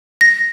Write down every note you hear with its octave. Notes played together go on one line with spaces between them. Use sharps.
A#6